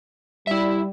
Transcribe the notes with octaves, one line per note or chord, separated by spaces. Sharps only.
G3 E4 E5